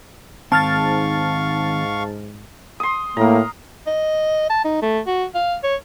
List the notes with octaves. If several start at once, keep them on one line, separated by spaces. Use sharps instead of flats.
G#2 D#3 C4 F5 A5 C#6 F6 A6
C6 D#6
A2 A#3 A#4 A#5
D#5
A5
D#4
A3
F#4
F5
C#5